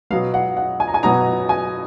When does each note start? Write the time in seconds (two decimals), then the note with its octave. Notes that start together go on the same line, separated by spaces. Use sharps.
0.10 B2 F#3 B3 F5
0.34 F#5
0.57 F#5
0.80 G#5
0.88 A#5
0.94 G#5
1.03 B2 F#3 B3 A#5
1.49 G#5